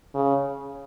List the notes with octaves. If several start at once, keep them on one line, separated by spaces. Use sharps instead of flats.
C#3